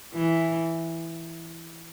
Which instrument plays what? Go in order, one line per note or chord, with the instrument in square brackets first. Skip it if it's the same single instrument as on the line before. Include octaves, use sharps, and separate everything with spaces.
[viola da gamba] E3